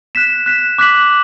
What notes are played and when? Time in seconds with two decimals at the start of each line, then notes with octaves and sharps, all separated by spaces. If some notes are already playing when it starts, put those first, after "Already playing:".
0.15 F#6 B6 E7
0.46 F#6 B6 E7
0.78 D6 F#6 B6 F#7